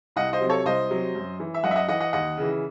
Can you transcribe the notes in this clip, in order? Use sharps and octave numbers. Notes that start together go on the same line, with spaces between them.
C2 D#5 F#5
C5 D#5
C3 F#3
A4 C#5
C2 C5 D#5
C3 F#3
F#2
E3
E5
F#2 D#5 F#5
E5
D#5 F#5
E3 D#5 F#5
D#5 F#5
D#2 D#5 F#5
C#3 E3